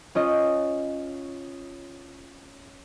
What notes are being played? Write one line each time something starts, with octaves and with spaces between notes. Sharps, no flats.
C#4 F4 D#5